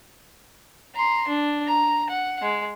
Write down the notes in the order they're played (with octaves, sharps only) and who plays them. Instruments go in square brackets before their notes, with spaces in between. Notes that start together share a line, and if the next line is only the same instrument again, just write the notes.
[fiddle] A#5 C6
D4
A#5
F#5
G#3